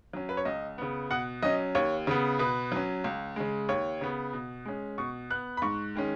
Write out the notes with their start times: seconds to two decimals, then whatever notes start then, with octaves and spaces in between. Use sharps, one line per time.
0.13 F#3 C#4
0.29 B4
0.37 C#5
0.45 C#2 D#5
0.78 C#3 B3
1.10 B2 F#5
1.43 F#3 C#4 D#5
1.75 D#2 C#5
2.07 C#3 B3
2.39 B2 B4
2.72 F#3 C#4
3.04 C#2
3.36 C#3 G#3
3.69 D#2 C#5
4.01 C#3 B3
4.33 B2
4.65 G#3 C#4
4.98 B2 C#6
5.30 B3 F#6
5.57 B5
5.62 G#2 C#6
5.95 D#3 G#3 C#4